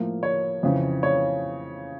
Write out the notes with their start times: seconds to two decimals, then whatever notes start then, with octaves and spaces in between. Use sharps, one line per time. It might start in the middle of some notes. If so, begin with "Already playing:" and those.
Already playing: A2 F3 A#3
0.23 C#5
0.63 F2 C#3 E3
1.03 C#5